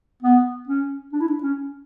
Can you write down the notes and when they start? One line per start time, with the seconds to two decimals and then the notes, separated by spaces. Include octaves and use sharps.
0.22 B3
0.67 C#4
1.13 D4
1.20 E4
1.28 D4
1.43 C#4